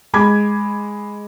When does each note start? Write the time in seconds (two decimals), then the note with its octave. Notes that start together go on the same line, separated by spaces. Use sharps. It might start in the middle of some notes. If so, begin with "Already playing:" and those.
0.14 G#3 B5 D6 G#6